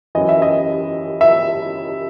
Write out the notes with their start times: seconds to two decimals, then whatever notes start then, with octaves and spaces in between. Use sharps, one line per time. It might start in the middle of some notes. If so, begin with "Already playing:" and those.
0.15 F#2 E3 D#5
0.29 E5
0.42 D#5
1.21 E5